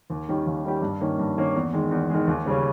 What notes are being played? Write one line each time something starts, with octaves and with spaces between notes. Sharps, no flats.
D#2
D#3 G3 C#4 G4
D#2
D#3 G3 C#4 G4
G2
D#3 A#3 C#4
G2
D#3 A#3 C#4
E2
D#3 G#3
E2
D#3 G#3
D#2
C#3 G3 C#4